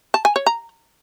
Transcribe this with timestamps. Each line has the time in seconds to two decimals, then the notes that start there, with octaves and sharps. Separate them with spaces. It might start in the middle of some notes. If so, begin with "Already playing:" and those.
0.14 A5
0.25 G#5
0.36 C#5
0.47 A#5